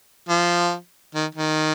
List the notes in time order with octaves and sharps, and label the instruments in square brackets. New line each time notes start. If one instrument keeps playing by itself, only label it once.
[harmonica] F3
D#3
D#3